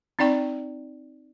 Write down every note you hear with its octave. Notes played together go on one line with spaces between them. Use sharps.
C4 D#4 D5 G5 C#6